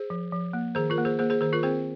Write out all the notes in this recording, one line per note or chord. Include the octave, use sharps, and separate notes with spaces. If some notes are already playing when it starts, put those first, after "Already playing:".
Already playing: G#4 C5
F3
F3
A#3
D#3 G#4 C5
F4 A#4
A#3
G#4 C5
A#3 G#4 C5
G#4 C5
D#3 G#4 C5
F4 A#4
C4 G#4 C5